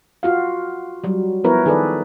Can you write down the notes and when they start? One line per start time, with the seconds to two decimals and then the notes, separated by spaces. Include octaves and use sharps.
0.23 F4 F#4 F5
1.04 F#3 G3
1.44 F3 B3 E4 A#4 B4 C#5
1.66 D#3 G#4 A4 B4 D5